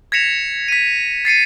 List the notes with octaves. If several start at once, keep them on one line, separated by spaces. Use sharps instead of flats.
G#6 A#6 B6 C#7 E7 F7
B6 D#7
A6 C7 C#7 D#7